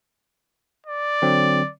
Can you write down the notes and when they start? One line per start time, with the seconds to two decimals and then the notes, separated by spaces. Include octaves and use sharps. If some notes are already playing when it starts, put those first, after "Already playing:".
0.86 D5
1.22 D3 F#3 C4